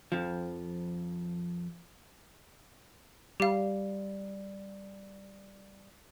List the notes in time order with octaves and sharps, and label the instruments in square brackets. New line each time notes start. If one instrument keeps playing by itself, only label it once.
[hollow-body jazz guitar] F2 F3
[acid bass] G3 [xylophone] G4 F5